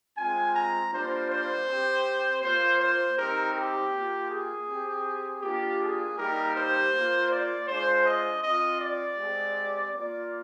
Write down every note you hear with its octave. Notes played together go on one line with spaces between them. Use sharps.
G#3 C4 F4 G#5
A#5
G3 A#3 D4 F4 C5
C5
C4 G4
A#3 F4 C5
C5
G3 C4 D#4 G4 A#4
G4
A#3 F4
G#4
C4 G4
A#3 D4 F4 G4
G#4
G3 A#3 D#4 G4 A#4
C5
A#3 F4
D5
G#3 D4 F4 C5
D#5
C4 F4 D#5
D5
G#3 C4 G4
A#3 F4 D5